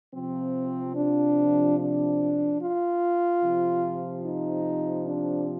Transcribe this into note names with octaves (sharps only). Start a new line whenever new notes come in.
C3 F3 C4
D4
D4
F4
C3 F3
D#4
D4